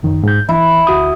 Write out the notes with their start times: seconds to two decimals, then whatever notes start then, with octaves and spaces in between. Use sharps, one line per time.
0.03 F#2 D#3
0.23 G#2 G6
0.49 E3 E4
0.87 D2 F#4 D#6